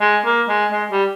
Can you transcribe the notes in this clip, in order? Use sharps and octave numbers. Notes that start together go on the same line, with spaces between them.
G#3
A#3
G#3
G#3
G3